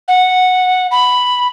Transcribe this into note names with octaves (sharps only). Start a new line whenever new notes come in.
F#5
B5